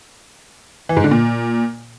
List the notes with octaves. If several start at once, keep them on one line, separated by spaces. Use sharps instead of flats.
E3
G#2
D3
A#2